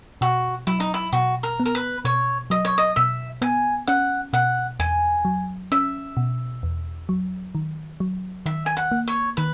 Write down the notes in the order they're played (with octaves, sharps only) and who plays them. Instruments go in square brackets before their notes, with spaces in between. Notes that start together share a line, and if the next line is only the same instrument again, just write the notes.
[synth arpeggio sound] B2 [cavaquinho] F#4
[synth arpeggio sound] F#3 [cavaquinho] E4
[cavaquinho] D#4
E4
[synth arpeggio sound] B2 [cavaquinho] F#4
[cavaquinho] A#4
[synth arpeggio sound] B3
[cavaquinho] A#4
B4
[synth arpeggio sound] B2 [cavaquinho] C#5
[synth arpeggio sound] F#3 [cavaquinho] D#5
[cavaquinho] C#5
D#5
[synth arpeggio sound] B2 [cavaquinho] E5
[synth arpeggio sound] B3 [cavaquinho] G#5
[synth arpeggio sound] C#4 [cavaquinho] F#5
[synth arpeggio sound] B2 [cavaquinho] F#5
[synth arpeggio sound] E2 [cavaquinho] G#5
[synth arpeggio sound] F#3
[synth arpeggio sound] C#4 [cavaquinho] E5
[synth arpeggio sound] B2
E2
F#3
D#3
F#3
[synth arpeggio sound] D#3 [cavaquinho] E5
[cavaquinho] G#5
F#5
[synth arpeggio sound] A#3
[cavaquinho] C#5
[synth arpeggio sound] D#3 [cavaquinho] B4